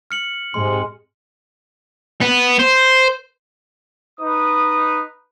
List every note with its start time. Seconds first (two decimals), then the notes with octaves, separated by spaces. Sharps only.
0.11 F6 C#7 F#7
0.54 G#2 C3 G#3 C6
2.21 B3
2.59 C5
4.20 D#4 B4 D#6